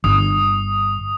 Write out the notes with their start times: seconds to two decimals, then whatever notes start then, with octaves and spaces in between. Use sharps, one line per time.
0.04 G1 D#6